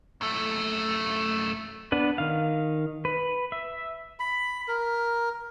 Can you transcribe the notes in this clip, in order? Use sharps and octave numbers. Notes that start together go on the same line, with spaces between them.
F#2 A3
B3 D4 B4
D#3 F5
B4
E5
B5
A#4